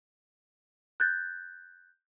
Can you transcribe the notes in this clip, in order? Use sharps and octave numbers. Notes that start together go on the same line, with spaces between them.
F#6 G6 A6